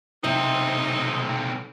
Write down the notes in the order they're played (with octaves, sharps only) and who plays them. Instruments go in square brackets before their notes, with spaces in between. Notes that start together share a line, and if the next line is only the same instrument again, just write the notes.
[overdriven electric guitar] B1 C4 [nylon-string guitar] C3 E5 [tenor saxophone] D#4